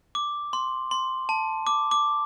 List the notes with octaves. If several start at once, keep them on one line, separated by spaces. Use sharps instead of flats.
D6
C6
C6
A5
D6
D6